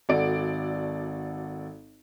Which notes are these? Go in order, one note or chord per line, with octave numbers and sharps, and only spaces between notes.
G#1 F#4 A4 D5 D7